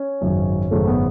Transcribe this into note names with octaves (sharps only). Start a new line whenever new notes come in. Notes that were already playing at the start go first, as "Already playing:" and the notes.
Already playing: C#4
G#1 F#2 C#3 F#3
G#1 F#2 C#3 F#3 A3
B3